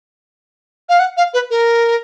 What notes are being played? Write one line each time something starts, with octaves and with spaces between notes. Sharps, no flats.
F5
F#5
F5
B4
A#4